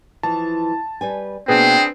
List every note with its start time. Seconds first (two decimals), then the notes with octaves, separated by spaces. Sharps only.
0.23 E3 F3 A5
1.01 G3 B4 G#5
1.48 B2 A#3 C4 D4 G#4 B4 G5